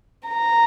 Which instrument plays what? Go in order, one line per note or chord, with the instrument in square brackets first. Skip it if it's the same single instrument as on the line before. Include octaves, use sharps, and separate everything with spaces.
[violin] A#5